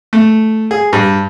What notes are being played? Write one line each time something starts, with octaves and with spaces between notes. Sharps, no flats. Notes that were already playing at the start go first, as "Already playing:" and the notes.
A3
G#4
G2